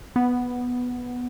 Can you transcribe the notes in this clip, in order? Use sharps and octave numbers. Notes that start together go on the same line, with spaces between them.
B3